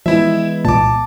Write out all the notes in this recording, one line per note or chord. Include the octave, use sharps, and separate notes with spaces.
E3 F3 G#3 B3 E4 E5
C2 A#2 A5 D6